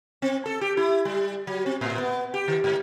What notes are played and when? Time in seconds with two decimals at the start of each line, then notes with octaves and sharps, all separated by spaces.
0.22 C4
0.46 A4
0.61 G4
0.77 E4
1.05 G3
1.47 F#3
1.66 C4
1.81 A2
1.98 B3
2.34 G4
2.48 D#3
2.64 G#2